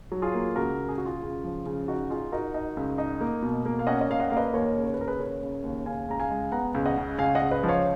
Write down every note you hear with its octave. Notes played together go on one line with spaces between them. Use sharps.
F#3
F4 G#4
A#3
C#2 F#4 A#4
C#3
G#4
C#3 F#4
F4 G#4
C#3
F3
C#3
D#4 F#4
D#4 F4 G#4
D#4 F#4 A#4
D#4
C#2
D#4
A#3
B2
A#3
F5
C#4 D#5 F#5
D#5
A#3 F5
D#5 F#5
A#3 F5
B4 D#5
D#2 A#4 C#5
C#3
C#5
B4
D#2 A#4
G#4 B4
C#3 A#4 C#5
C#3
D#2
C#3 F5 G#5
C#2 A#5
F5 G#5
G#3
B3 F#5 A#5
C#2
D#5 F#5
C#3
C#2 F5 G#5
D#5 F#5
C#2
B4 D#5
F3
C#5 F5